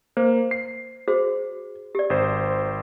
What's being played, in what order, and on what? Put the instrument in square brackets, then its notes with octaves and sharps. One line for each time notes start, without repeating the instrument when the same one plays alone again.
[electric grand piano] A#3 [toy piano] C5
[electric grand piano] C7
[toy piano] F#4 G#4 C5
G4 D5
[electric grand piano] G#1 C5